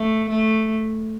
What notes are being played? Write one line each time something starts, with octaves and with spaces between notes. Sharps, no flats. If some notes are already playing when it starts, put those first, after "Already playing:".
Already playing: A3
A3